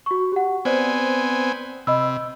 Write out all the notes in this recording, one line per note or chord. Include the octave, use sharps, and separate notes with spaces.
F#4 C#6
G4 F#5
B3 C4 C5 D5 G#5
C3 D#5 B5 E6